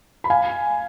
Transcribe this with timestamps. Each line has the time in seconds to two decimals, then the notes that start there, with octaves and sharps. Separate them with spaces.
0.24 B5
0.30 F5 G#5